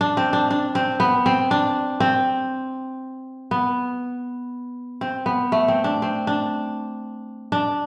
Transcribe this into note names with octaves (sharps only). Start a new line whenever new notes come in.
D4
C4
D4
D4
C4
B3
C4
D4
C4
B3
C4
B3
A3
C4
D4
C4
D4
D4